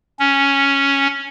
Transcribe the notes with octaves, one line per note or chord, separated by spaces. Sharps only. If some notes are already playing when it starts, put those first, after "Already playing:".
C#4